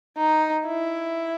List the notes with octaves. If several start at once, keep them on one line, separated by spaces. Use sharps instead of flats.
D#4
E4